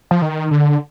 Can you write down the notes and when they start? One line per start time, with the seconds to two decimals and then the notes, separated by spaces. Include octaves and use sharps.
0.11 F3
0.22 D#3
0.51 D3